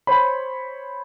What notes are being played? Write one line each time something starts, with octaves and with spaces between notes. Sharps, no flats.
C5 C#5 B5